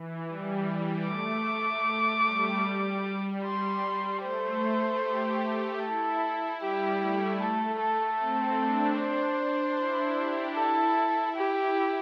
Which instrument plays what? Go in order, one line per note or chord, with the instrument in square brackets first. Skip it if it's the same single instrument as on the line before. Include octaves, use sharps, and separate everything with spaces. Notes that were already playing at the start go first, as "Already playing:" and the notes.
Already playing: [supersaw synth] E3
G3
[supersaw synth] A3 [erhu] D6
[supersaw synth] G3
G3
G3
[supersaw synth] G3 [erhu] C6
[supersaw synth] A3 [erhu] C5
[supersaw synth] G4
[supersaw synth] E4 [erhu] A4
[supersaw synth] G3 [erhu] G4
[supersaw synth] A3
[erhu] A4
A4
[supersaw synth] C4
D4
[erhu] C5
[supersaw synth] E4
G4
[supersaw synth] E4 [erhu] A4
[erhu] G4